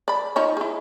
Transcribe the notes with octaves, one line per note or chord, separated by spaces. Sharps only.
D5 B5
D#4 F4 C#5
E4 G#4